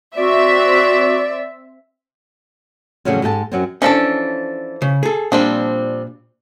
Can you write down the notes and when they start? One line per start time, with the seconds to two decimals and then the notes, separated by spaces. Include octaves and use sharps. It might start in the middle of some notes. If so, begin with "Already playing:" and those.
0.17 C4 F#4 D5 E5
3.05 F2 A2 C#3 E3 F#3 G3
3.22 G#2 G4 A4 G5 A5
3.52 F#2 F#3 C4
3.82 E3 F3 C#4 D4 A4
4.82 C#3
5.03 G#4 A4
5.32 A#2 F3 G3 C4 D4